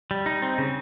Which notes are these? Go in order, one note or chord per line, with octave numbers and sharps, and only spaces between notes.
G3
D#4
C4
C#3